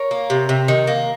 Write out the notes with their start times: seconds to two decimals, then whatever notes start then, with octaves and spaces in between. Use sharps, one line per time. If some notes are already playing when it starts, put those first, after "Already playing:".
Already playing: A#4 C#5
0.11 A#3
0.30 C3
0.49 C3
0.68 D#3
0.87 A#3